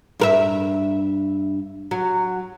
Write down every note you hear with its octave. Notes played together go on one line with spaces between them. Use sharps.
G2 A#4 E5
F#3